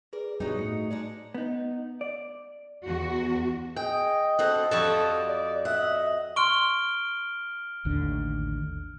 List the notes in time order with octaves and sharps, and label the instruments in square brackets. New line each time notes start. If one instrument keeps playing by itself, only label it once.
[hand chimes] G#4 B4 [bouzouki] A#4 D5
[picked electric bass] G2 B2 G3 [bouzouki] F#3 D#4
[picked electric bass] A2 [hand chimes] C#7
[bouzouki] G#3 D4 D#4 [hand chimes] D5
[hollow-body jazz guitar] B3 D#4
D5
[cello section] E2 F#4
[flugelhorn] G#4 [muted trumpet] D#5 [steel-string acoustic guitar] G5
[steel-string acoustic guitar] D2 C4 F#5 [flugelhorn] A4
[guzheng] F2 F#4 A5 [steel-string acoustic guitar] G3 [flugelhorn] A4
[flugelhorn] D5
[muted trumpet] D#5 [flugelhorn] E5 [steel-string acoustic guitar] F#5
[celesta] C6 C#6 [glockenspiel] F6 D7 G7
[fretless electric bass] A1 D#2 D3